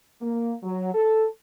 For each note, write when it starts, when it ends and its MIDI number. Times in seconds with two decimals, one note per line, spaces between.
0.22 0.53 58
0.63 0.92 54
0.94 1.26 69